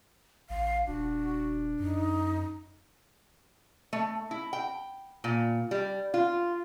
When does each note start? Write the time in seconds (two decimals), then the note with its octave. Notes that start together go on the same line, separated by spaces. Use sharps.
0.50 A1 F5
0.87 D#1 D4 F#4
1.79 F#2 D#4
3.93 A3
4.31 E4
4.53 G5
5.24 A#2
5.71 G3
6.14 F4